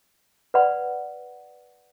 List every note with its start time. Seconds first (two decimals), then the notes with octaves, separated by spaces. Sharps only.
0.54 B4 D5 F#5 B5